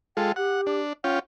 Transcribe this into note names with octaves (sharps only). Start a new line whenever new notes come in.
G#3 F4 A4 G5
G4 F#5
D4
C#4 F4 F#5 G5